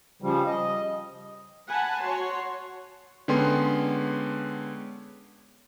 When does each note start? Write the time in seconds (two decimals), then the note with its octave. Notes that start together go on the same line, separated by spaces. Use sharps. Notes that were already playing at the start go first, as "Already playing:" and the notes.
0.22 C#3 F3 G3
0.46 D#5
1.67 F#5 G#5 A5 B5
2.03 F#4 C#5 C6
3.28 D3 G#3 B3 C#4 G5 C6